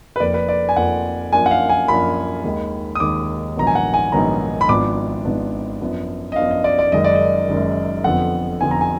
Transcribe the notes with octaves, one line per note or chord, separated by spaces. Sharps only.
B4
F1 F2 F3 A#3 D5
B4
D5
G#5
F1 F2 F3 A#3 F#5
F#2 F3 A#3 D4 G#5
F#5
F5
G#5
F#2 F3 A#3 D4 B5
D#2 D#3 G#3
D#6
D#2 D#3 G#3 D6
A#1 G#2 D#3 F#3 B3 A#5
G#5
F#5
G#5
A#1 G#2 D#3 F#3 B3 A#5
B5
G#1 G#2 F3 B3 D4 D6
G#1 G#2 F3 B3 D4
F#2 F3 B3 D4
D#5
F#2 F3 B3 D4 F5
D#5
D5
D5
F#1 F#2 D#3 G#3 D#5
D5
D#5
F#1 F#2 D#3 G#3
F1 F2 D3 F3 B3 F#5
F1 F2 D3 F3 B3 G#5
A#5
G#5